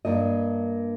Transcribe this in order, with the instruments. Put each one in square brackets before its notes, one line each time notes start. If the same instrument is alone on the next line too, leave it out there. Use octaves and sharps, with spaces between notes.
[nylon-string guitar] G2 A#3 D#5